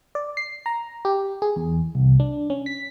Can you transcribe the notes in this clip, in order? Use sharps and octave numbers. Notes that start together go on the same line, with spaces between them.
D5
C7
A#5
G4
G#4
E2
C2
D4
C#4
B6